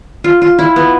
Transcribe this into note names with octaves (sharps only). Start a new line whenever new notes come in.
F4
F4
E4
B3